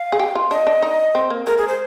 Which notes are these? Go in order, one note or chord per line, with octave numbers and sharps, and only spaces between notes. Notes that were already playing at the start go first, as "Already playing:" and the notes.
Already playing: F5
G#4
G4
F4
D4 D#5
D4
D#4
C4
A#3
G#3 A#4
G#4
C5